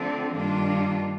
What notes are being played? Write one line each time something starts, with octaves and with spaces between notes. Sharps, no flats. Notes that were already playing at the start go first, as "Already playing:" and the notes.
Already playing: D3 F3 A3 C4
G2 D#3 A#3 D4 F4